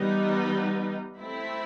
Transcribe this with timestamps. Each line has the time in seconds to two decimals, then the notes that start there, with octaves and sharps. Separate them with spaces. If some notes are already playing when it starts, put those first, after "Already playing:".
Already playing: E3 G3 B3 D#4
1.18 A3 C4 E4